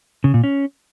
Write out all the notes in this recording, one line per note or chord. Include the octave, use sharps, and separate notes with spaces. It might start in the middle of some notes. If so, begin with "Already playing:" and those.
C#3
A#2
C#4